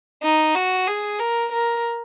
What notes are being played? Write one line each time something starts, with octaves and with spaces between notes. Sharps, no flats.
D#4
F#4
G#4
A#4
A#4